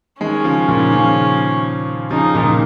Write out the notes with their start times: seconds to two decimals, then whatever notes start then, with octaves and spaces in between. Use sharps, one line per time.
0.21 D#3 G#3 C#4
0.44 C#3 F3
0.68 A#2 D#3
0.92 C#3 F3
2.10 C#3 F3 D#4
2.35 A#2 D#3
2.50 D#3